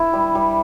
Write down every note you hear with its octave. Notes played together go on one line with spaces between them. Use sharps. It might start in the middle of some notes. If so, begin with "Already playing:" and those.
Already playing: E4
G3
G3